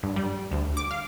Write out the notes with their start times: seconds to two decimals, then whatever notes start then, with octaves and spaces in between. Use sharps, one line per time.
0.03 G2
0.16 G3
0.52 D2
0.77 D6
0.91 F5